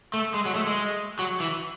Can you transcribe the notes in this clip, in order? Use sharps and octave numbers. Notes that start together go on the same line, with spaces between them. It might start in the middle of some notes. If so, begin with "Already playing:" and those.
A3
G#3
F#3
A3
G#3
F#3
E3